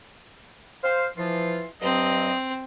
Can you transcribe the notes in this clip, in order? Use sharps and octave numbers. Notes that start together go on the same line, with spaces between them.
C5 F5
E3 F3 F4
G2 F#3 C4 D#5